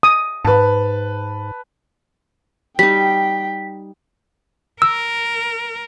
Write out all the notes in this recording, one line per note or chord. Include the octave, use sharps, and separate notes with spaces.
D#6
G#2 B4 A5
G3 D#4 G5 B6
A#4 E6